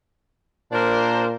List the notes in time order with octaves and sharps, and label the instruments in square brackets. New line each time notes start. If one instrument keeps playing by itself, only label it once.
[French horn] A#2 [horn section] D4 A#4 C5